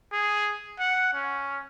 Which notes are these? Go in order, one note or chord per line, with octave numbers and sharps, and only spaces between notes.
G#4
F#5
C#4